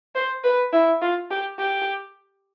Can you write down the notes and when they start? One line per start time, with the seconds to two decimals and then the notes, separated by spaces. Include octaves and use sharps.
0.15 C5
0.44 B4
0.73 E4
1.01 F4
1.31 G4
1.59 G4